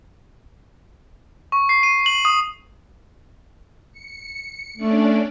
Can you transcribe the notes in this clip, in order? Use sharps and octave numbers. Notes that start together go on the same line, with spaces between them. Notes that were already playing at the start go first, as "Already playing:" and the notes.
C#6
C7
D#7
F#7
D#6
C#7
A3 C#4 D4 D5